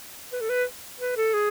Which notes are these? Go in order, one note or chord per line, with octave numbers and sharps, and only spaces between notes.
B4
A4
B4
B4
A4
G#4